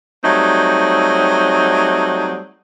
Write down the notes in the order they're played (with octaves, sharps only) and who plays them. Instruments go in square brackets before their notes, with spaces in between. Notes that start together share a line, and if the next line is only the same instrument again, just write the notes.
[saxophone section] F#3 G3 A3 C4 D#4